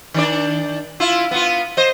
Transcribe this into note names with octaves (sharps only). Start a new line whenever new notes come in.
D#3 D4 D5
E4 F4
B3 F4
C5 D#5